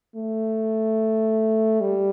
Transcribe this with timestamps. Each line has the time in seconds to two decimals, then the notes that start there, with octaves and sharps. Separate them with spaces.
0.15 A3
1.81 G3